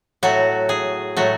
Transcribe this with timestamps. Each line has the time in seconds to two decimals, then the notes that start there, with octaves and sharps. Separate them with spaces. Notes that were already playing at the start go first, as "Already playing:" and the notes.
0.23 A2 F#3 A3 F#4
0.69 G#4
1.16 A2 F#3 A3 F#4